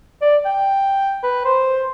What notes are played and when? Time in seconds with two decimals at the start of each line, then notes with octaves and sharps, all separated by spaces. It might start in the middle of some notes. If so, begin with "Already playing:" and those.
0.22 D5
0.45 G5
1.23 B4
1.45 C5